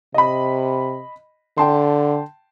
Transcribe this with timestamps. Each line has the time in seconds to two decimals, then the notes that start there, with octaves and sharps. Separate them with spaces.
0.14 C3 D#5 B5
1.58 D3 G5 A5 C6